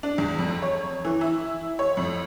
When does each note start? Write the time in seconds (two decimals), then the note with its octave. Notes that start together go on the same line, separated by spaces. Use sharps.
0.03 D4
0.18 E2
0.39 F2
0.62 C#5
1.05 E3
1.21 E4
1.79 C#5
1.97 F2